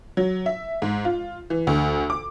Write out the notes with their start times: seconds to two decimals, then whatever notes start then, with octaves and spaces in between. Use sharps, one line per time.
0.17 F#3
0.46 E5
0.82 G#2
1.05 F4
1.50 E3
1.67 D2
2.10 D6